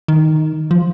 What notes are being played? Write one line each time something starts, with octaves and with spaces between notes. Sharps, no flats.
D#3
F3